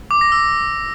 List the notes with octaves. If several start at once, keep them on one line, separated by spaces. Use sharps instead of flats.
D6
A#6
E6